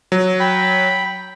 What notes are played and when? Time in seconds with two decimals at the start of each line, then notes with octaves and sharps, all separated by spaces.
0.12 F#3
0.40 G5 B5